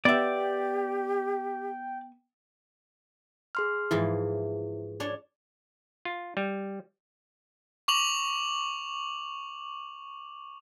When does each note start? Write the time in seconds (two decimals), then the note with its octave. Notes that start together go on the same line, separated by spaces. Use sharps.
0.05 B3 G4 D5 E5 G5
3.55 G#4 C6 F6
3.91 G#2 E3 F3 E4
5.00 D4 C#5
6.05 F4
6.37 G3
7.88 C#6 D6 F7 F#7